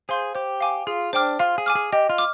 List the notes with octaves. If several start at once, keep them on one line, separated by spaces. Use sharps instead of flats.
G#4 C5 F5 C6 G6
G4 C5
F5 G#5 D6
F4 G#4
D4 C5 G5 D6 F6
F4 F5
G#4
G#5 D6 F6
G#4
G4 D#5
F4
D6 F6